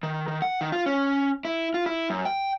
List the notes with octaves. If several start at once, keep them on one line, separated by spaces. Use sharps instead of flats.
D#3
D#3
F#5
D#3
F4
C#4
E4
F4
E4
F#2
G5